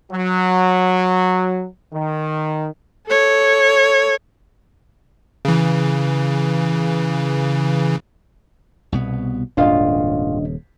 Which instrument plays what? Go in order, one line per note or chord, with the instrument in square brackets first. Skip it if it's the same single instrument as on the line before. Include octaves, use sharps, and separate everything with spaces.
[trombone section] F#3
D#3
[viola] A4 C#5
[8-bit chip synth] C#3 E3
[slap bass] C2 B2 B3
[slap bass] D#1 C#3 [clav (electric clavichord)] G#1 F4 F5 [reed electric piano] D4 D#5